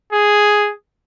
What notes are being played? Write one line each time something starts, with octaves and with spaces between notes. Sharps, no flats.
G#4